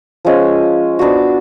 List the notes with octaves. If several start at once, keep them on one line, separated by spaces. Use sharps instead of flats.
F3 G#3 C#4
B3 D4 F#4